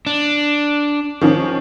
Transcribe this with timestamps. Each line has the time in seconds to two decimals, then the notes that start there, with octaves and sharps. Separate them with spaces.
0.07 D4
1.21 D#3 F3 C#4